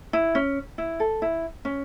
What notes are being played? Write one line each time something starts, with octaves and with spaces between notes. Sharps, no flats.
E4
C#4
E4
A4
E4
C#4